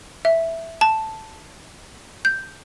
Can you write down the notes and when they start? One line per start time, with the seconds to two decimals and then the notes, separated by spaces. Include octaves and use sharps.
0.25 E5
0.81 A5
2.25 G6